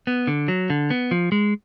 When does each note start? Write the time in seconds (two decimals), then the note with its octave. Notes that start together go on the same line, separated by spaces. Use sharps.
0.07 B3
0.27 D3
0.48 F#3
0.70 D3
0.90 B3
1.11 F3
1.32 G#3